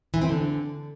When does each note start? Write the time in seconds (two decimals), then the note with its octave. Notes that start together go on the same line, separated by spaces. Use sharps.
0.14 E3
0.21 C4
0.29 D3